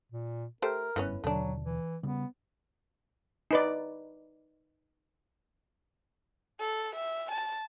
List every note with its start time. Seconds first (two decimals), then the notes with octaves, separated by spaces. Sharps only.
0.12 A#2
0.62 A3 G4 A#4 C5
0.96 F#1 G2 E3 B3 C#4
1.24 D#2 B2 D3 F#3 A3 D4
1.64 E3
2.03 C#3 G3 B3
3.51 D#4 B4 D5
6.59 A4
6.95 E5
7.31 A5